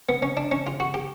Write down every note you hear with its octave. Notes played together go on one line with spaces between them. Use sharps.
B3
C#4
D4
C#4
F4
F#4
G4